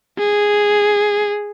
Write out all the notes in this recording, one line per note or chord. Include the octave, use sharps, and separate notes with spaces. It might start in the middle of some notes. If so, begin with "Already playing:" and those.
G#4